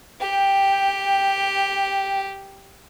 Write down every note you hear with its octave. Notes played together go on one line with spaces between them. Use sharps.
G4 G5